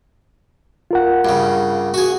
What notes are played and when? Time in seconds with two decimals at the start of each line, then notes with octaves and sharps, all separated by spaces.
0.91 F4 A#4 F#5
1.25 G2 C#3
1.94 F#4 G#4